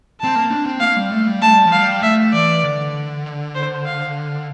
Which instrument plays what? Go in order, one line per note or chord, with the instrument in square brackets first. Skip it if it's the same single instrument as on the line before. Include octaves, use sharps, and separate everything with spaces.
[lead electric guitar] C4 [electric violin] A5
[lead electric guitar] A#3
D4
C4
[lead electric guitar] A#3 [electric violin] F5
[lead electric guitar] G3
A3
G3
[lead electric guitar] A3 [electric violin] A5
[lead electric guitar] G3
F3
[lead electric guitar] G3 [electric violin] F5
[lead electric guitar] A3 [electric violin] E5
[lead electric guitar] E3 [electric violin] D5
[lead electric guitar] D3
[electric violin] C5
F5